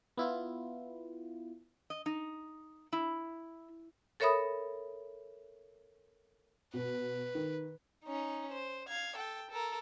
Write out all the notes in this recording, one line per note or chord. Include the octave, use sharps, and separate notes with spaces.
B3 E4 F4
D#5
D#4
E4
A4 A#4 C#5 E5 B5 D#6
B2 B4
D#3
C#4 D#4
C5
F5 G#6
A4 G5
A4 A#4